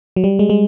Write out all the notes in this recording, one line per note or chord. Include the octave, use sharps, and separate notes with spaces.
F#3
G3
G#3
G#3